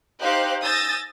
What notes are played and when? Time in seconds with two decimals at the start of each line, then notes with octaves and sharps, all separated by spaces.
0.21 D#4 G4 C5 F5 F#6
0.63 G#5 D#6 E6 G6 A6 A#6